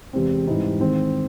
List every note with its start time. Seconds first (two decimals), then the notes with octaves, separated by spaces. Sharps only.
0.13 E2 C3 E3 G#3 C4
0.47 G#2 E3 G3 C4 D#4
0.80 D#3 G#3 C4